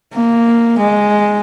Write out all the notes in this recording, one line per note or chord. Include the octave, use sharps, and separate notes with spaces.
A#3
G#3